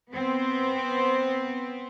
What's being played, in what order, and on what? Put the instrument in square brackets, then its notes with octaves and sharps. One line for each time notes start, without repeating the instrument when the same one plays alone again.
[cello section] B3 C4